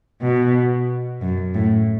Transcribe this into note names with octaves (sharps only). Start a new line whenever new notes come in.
B2
F#2
A2